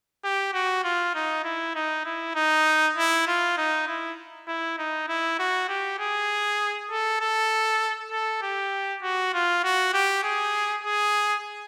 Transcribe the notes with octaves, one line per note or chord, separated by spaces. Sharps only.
G4
F#4
F4
D#4
E4
D#4
E4
D#4
E4
F4
D#4
E4
E4
D#4
E4
F#4
G4
G#4
A4
A4
A4
G4
F#4
F4
F#4
G4
G#4
G#4